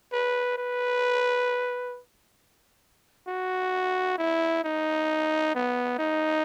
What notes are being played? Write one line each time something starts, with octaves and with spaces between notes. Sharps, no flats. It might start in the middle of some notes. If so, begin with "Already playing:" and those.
B4
B4
F#4
E4
D#4
B3
D#4